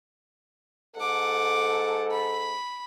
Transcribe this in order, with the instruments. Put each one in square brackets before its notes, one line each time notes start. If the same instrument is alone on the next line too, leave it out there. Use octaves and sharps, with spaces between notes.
[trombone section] G#2 A4 [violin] F#5 D6
[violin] B5